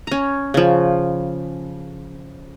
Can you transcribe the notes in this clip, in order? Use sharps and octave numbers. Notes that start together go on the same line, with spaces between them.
C#4 A#5
C#3 F3